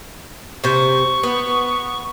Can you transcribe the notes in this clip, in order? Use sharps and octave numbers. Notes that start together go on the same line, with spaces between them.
C3 C5 C#6
B3